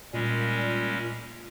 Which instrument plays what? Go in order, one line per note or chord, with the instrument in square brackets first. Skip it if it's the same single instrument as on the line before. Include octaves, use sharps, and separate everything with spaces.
[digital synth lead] A#2 [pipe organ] G3 G#3 C#4